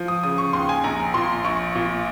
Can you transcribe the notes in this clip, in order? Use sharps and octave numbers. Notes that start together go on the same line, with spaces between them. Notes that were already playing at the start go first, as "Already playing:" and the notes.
Already playing: F3
D#6
C#3 D#6
C#6
D#2 C6
G#5
A#1 A#5
A#2 C6
A#1 C#6
A#2